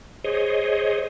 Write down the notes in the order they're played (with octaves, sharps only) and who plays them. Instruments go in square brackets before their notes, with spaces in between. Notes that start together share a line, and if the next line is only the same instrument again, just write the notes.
[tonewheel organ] G#4 C5 C#5 D#5